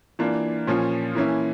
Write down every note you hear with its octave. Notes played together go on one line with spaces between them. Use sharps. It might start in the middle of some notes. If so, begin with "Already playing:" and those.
E3 A#3 D4 F4
A#2 F3 C#4 F4
E3 A#3 C#4 E4